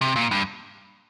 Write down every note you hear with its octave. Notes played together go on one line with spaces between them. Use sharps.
C3
A#2
G2